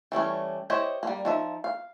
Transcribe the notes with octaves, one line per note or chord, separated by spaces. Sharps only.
E3 G3 A3 C#4
E4 G4 C5 C#5 D#5
G3 A#3
F3 D#4 E5
F5